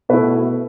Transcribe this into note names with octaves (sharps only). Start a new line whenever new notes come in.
B2 A3 E4 B4